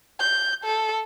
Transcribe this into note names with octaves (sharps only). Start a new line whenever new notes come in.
G6
A4